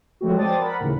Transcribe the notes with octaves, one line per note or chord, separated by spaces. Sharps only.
F3 F#3 G#3 A3 C4 F#4
C5 D5 G5 A5 D#6 A6
A#4 F#5 B5
D#2 A2 C#3 E3